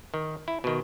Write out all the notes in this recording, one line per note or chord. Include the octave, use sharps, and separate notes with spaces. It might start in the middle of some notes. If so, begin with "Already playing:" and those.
D#3
E4
B2 D#3